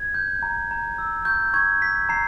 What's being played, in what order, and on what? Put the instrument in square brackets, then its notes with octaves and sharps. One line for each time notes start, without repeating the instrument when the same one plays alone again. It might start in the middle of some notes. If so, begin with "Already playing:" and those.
Already playing: [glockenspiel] G#6
G6
A#5
A#5
E6
C#6 G6
C#6 G#6
E6 B6
A#5 C7